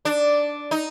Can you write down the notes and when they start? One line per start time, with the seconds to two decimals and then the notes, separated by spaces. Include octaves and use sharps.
0.05 D4
0.71 D#4